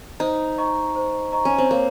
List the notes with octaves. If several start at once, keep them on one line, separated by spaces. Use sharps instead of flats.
D#4 C5
D#5 A#5 C#6
C5
D#5 A#5 C#6
C#4
C4
A#3 C#5